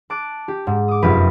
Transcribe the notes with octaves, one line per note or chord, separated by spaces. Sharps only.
A5 D6 F#6 D7
G4
G#2
D6 D#6
F1 F#2 F4 G4 B4 D#7